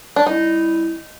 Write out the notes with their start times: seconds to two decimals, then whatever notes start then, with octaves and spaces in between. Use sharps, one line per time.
0.16 D4
0.26 G3 C4 D#4 E4